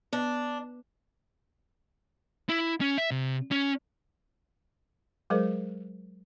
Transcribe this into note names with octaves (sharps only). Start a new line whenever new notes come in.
B3 D4
E4
C#4
E5
C3
C#4
F#3 G#3 G#4 A#4 C5